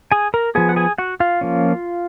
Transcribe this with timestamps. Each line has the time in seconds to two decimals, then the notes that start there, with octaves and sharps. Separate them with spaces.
0.12 G#4 G#5
0.34 A#4 A#5
0.55 F3 B3 G#4 G#5
0.69 F#5
0.76 G#4 G#5
0.98 F#4 F#5
1.20 F4 F5
1.41 F3 A#3 C#4